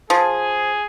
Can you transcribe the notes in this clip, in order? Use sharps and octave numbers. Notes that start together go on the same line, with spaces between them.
F3 G#4